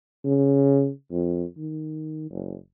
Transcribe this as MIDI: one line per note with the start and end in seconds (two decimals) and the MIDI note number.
0.25 0.90 49
1.11 1.44 41
1.57 2.30 51
2.31 2.56 30